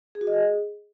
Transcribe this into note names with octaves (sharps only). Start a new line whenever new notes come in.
G#4
F#4
D#5
G#4